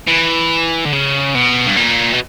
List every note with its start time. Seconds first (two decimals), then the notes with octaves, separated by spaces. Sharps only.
0.08 E3
0.85 D3
0.93 C#3
1.35 B2
1.67 G2
1.77 A#2
2.13 B2